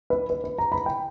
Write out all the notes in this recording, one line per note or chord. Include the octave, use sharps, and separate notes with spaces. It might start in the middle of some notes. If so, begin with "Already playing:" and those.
B4
B4
B4
A#5
B5
G5